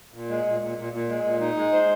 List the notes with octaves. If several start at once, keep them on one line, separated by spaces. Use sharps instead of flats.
A#2
G#3
A#2
A#2
A#2
A#2
G#3
A#2
D#4
G#3
C5